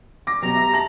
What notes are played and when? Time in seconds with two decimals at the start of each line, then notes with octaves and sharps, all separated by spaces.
0.27 D6 A#6
0.42 B2 F#3 G4 A#5
0.55 E5
0.73 A5 A#6 F#7